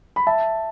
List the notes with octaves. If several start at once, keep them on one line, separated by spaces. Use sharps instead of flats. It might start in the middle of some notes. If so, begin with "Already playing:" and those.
B5
E5 A5